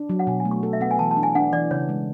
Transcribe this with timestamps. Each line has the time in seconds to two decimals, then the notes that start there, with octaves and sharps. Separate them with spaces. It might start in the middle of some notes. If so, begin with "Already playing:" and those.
Already playing: D4
0.10 F#3
0.19 F#5
0.27 B2 G#5
0.40 G#5
0.45 A3
0.51 C#6
0.63 A4
0.73 E5
0.81 B3 F#5
0.91 G#5
0.99 E3 A5
1.11 A5
1.17 D4
1.23 G#5
1.35 D4 F#5
1.53 E3 D5
1.71 C#3 C#5
1.89 G#3